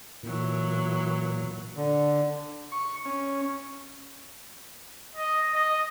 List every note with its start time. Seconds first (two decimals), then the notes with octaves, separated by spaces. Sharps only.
0.23 A#2 E3 F#3
1.77 D3
2.72 C#6
3.05 C#4
5.16 D#5
5.54 D#5